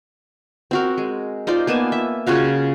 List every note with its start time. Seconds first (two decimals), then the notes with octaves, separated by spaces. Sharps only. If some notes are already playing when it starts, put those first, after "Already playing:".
0.71 C4 F#4 A#4
0.98 G#3
1.47 D#4 F4 C5 D5
1.67 A#3 B3 G#5 A5
1.92 E5
2.26 C#3 F4 F#4 F5